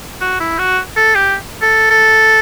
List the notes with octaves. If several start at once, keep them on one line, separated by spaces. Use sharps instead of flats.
F#4
E4
F#4
A4
G4
A4
A4